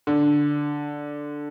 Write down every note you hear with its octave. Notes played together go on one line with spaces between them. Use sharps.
D3